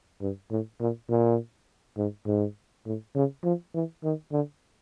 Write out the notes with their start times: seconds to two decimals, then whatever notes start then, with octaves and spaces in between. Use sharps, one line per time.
0.21 G2
0.51 A2
0.80 A#2
1.09 A#2
1.97 G#2
2.27 G#2
2.86 A2
3.15 C#3
3.44 F3
3.74 E3
4.04 D#3
4.32 D3